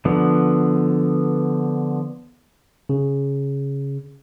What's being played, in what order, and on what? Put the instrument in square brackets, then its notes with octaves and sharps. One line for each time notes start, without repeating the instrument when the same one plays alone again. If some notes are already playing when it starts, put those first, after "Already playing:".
[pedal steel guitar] D3 F3 B3
[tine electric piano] C#3